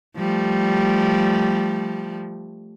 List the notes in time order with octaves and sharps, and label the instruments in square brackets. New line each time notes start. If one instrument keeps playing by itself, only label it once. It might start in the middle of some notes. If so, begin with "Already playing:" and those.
[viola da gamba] F3 G3 A3